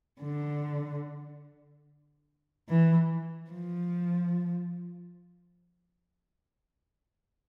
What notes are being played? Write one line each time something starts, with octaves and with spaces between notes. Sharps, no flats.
D3
E3
F3